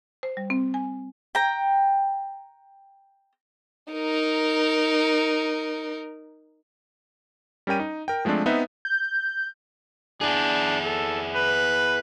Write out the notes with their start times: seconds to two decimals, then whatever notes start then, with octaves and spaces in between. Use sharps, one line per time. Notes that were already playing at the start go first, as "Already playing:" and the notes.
0.23 C5
0.37 G3
0.50 C4
0.74 G#5
1.35 G5 A#5
3.93 D#4 A#4
7.67 G3 C#4 A#4 G5 D#7
7.79 D#4
8.08 A#4 G5
8.25 F3 G#3 A3 C4 D4
8.46 B3 C4 D#4 B4 E5
8.85 G6
10.21 D4 E4 G#4
10.84 A4
11.34 B4